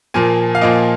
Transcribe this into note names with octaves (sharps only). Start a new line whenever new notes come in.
A#2 F3 A#3 G#5
F5
A#2 F3 A#3 D#5